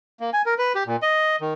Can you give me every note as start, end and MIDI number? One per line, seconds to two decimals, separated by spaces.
0.20 0.30 58
0.33 0.42 80
0.46 0.54 70
0.58 0.73 71
0.75 0.83 67
0.86 0.96 46
1.02 1.36 75
1.41 1.54 51